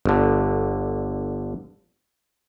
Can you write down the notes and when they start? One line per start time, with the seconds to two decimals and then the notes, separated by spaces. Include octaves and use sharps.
0.06 G1 D3